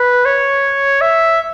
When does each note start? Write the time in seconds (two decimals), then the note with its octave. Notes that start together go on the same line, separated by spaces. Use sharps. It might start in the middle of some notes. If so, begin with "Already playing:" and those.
Already playing: B4
0.26 C#5
1.01 E5